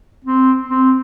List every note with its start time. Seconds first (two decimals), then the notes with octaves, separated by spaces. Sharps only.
0.24 C4
0.70 C4